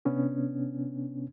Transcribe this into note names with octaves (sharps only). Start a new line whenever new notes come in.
C3 B3 C#4 D4